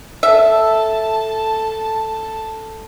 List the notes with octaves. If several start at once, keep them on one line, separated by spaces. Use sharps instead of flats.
A4 E5 A5